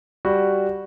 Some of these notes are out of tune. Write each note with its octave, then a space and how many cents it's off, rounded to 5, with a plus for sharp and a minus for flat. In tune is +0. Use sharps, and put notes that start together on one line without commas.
G3 +0 F#4 +0